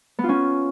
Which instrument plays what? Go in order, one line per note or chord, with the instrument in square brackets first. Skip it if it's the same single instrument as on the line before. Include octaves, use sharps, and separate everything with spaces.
[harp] B3
F4
C#4